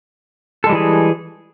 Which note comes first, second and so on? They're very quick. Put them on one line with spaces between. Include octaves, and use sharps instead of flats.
A4 G#3 G3 E3 G#4